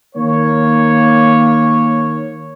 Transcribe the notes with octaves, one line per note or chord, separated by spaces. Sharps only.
D#3 A#3 C#5